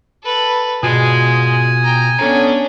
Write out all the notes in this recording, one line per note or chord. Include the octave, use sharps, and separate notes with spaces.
A4 B4
B2 G#3 F4 F#4 G#5 D#6
G5 A#5
B3 C#4 D4 A4 A#5